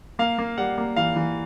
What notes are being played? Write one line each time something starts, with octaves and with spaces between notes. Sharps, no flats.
A#3 F5
A#3
G3 F#5
A#3
E3 F5
E3